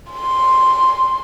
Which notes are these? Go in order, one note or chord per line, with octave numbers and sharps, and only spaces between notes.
C6